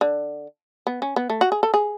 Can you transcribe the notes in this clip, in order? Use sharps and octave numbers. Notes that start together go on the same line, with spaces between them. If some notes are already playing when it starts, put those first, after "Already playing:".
D3
B3
C#4
B3
A3
F#4
G#4
A4
G#4